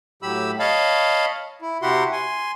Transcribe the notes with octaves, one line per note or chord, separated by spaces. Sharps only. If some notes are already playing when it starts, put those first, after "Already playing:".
A2 F#3 G4 B5 E6
C#5 D#5 F5 A5 B5
E4
C3 E4 F#4 G4 F#5 C6
G#5 C6